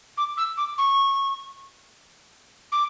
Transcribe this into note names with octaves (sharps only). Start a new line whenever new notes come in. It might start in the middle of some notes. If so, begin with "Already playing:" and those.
D6
E6
D6
C#6
D6